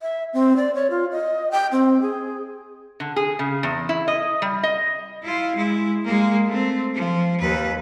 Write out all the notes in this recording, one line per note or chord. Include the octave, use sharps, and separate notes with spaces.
E5
C4
D5
C#5
F4
D#5
G5
C4
G#4
D3
G#4
C#3
E2
E4
D#5
G3
D#5
E4 F4
G#3 E4
G#3 A#3
A3 C4
F3
D#2 B4